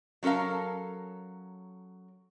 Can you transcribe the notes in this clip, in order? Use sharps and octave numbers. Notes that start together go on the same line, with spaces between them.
F#3 C#4 A4 A#4 F5